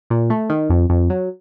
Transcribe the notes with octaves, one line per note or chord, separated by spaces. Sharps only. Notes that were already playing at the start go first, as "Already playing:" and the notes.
A#2
A3
D#3
F2
F2
F#3